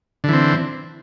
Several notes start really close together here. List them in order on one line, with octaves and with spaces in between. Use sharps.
D3 E3 C4